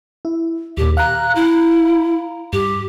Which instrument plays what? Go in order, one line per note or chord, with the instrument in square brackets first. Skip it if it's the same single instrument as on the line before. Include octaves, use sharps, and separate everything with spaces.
[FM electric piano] E4
[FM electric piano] D#2 A#2 [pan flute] G4
[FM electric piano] F5 A#5 [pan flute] F#6
[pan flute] E4
[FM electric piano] G2 [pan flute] G4